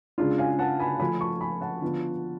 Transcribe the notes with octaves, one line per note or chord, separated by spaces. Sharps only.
C#3 G#3 D4 F4
F5 G#5
F#5 A5
G#5 B5
F3 A3 F4 G#5 B5
A5 C#6
G#5 B5
F#5 A5
D3 F3 B3 F4